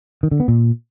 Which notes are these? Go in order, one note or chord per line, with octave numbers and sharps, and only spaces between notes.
D#3
D3
B3
A#2